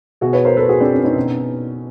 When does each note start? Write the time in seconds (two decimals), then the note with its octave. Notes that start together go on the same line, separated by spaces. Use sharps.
0.21 B2 F#4 G#4
0.33 B4 C#5
0.45 A#4 C5
0.57 A4 B4
0.69 F#4 G#4
0.81 C4 D4
0.93 C#4
1.04 C#4 D#4
1.16 B2